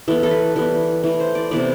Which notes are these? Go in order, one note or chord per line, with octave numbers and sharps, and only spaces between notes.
E3 B3 A4
A4
B4
E3 G3 B3
E3 A3
C5
D5
C3 E3 B3 D5